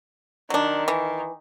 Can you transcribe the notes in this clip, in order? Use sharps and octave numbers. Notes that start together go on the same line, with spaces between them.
D#3 F#3 D4
E3